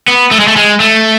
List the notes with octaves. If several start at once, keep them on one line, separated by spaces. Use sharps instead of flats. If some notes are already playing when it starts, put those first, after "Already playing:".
B3
A3
G#3
A3
G#3
A3